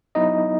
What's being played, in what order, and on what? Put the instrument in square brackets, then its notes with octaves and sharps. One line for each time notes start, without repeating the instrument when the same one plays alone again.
[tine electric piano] F#3 B3 D#4 E4 D#5